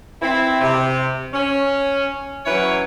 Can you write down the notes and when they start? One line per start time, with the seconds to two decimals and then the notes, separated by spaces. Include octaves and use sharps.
0.22 C4 E4
0.61 C3
1.34 C#4
2.46 E3 F#3 C#4 E4 B4 C#5